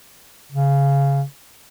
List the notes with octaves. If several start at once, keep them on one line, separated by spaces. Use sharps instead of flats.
C#3